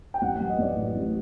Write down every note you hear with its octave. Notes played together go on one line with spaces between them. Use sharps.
G5
A1 F#5
F#3 F#5
D#5
A1 D5
A2
A1